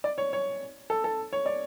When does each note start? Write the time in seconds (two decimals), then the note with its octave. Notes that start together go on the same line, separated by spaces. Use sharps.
0.04 D5
0.18 C#5
0.33 C#5
0.90 A4
1.04 A4
1.33 C#5
1.46 D5